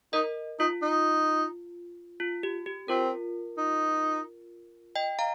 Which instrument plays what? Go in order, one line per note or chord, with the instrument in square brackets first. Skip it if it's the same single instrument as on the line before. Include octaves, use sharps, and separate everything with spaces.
[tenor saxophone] D#4 [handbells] A#4 D#5
[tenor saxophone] D#4 [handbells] F4
[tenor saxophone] D#4
[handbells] F4
G4
G4
[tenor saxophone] C4 [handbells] F4 A#4
[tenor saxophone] D#4
[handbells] D#5 G5
F5 A#5